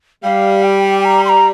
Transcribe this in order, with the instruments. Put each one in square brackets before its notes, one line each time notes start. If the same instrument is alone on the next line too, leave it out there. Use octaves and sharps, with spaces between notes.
[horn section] G3 [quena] F5
[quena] G5
A#5
C6
A#5